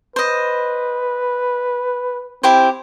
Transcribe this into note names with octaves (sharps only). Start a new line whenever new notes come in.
B4 C5 D#5
C4 E4 G4 C5